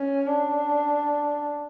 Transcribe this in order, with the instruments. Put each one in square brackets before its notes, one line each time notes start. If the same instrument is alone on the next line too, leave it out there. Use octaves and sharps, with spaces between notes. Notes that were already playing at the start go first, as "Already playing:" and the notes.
Already playing: [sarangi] C#4
D4